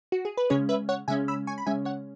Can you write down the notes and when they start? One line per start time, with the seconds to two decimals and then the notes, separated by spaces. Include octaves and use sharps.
0.12 F#4
0.25 G#4
0.37 B4
0.50 C#3 G#3 C#4 G#4 C#5
0.69 B4 E5
0.89 C#5 F#5
1.08 C#3 G#3 C#4 E5 G#5
1.28 B5 E6
1.47 G#5 C#6
1.58 B5
1.66 C#3 G#3 C#4 E5 G#5
1.85 C#5 F#5